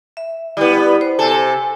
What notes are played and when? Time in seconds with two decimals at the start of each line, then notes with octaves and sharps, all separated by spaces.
0.17 E5
0.57 G3 B3 E4
1.01 C5
1.19 C3 A4 G#5